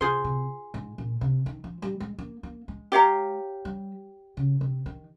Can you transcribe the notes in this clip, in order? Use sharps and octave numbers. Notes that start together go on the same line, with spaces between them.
C3 F4 G#4 C5
C3
G#2
A#2
C3
D#3
F3
G3
G#3
A#3
A#3
G#3
G4 C#5 F5 A#5
G3
C#3
C3
D#3